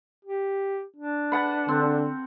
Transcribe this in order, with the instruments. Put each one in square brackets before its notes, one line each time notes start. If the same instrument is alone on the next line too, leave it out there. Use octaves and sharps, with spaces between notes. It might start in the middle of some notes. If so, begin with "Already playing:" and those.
[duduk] G4
D4
[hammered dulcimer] B4 F#5 A5
[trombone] D3 [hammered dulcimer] C4